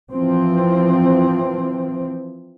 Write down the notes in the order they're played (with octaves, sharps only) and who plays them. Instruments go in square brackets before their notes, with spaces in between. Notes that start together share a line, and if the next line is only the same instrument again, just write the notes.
[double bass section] E3 F3 C4